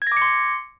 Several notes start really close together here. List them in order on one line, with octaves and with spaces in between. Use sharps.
G#6 A#6 D6 C#7 C6